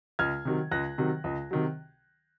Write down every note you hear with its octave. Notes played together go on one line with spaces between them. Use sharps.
C#2 F6 G#6
C3 D#3 F#3
C#2 F#6 A#6
C3 D#3 F#3
C#2
C3 D#3 F#3